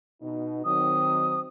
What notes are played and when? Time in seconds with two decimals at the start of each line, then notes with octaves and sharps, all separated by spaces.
0.22 B2 D#4
0.65 D#3 F#3 C4 D#6